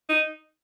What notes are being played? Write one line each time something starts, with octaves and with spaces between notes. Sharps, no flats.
D#4